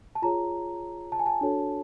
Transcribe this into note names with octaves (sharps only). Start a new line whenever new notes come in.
A5
F4 G#4 C#5 A#5
A5
G#5
A5
D4 F#4 A4 C#5